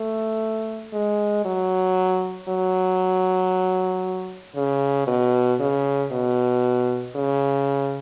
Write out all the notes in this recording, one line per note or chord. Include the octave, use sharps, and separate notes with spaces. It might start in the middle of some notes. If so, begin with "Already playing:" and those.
Already playing: A3
G#3
F#3
F#3
C#3
B2
C#3
B2
C#3